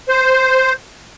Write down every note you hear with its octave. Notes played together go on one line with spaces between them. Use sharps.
C5